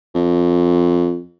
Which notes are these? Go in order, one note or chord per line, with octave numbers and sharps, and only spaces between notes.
F2